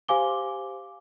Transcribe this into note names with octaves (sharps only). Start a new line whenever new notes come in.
G4 C5 F5 G#5 D6 G7